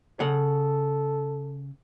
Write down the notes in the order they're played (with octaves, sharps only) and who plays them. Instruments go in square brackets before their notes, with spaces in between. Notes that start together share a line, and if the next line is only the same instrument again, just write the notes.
[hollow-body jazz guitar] C#3 F#5 [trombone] A4